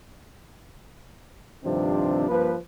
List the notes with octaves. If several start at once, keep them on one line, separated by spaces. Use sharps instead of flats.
G2 C3 D#3 F3 C4 D4
G2 F3 A#3 B4